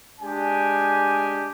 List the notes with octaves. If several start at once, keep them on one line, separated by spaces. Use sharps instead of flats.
G#3 D4 G4 G#5